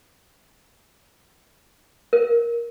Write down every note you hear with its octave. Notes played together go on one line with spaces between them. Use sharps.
A#4